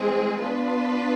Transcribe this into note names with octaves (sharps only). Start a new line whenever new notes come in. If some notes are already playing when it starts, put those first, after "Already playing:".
Already playing: E3 G#3 C4 G#4
B3 D4 F4 B4